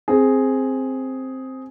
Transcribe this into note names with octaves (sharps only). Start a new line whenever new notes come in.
C4 G#4